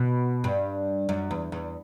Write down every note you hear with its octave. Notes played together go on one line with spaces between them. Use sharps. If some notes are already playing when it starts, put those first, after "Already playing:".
Already playing: B2
G2
F#2
E2
E2